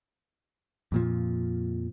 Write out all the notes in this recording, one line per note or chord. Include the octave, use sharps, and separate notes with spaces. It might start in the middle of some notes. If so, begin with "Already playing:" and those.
F2 A#2 F3